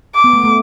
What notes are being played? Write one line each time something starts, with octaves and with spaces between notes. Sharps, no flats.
D6
B3
A3
A3